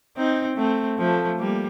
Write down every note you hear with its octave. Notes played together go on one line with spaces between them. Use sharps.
C4 D#4
A3 C4
F3 A3
G3 A#3